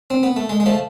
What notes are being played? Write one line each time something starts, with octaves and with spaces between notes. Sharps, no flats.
C4
B3
A3
G#3
G#3
F3 A3